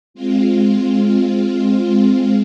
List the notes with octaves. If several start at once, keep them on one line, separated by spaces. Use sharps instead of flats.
G#3 C4 F4